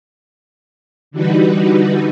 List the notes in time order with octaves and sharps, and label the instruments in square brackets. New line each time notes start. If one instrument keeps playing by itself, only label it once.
[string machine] D3 E3 G3 D#4 F#4 B4